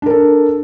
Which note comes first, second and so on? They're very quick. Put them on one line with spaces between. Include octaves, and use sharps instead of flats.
D4 A#4 A4